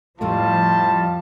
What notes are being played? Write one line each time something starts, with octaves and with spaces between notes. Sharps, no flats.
F2 A2 F3 G3 A3 F4 A5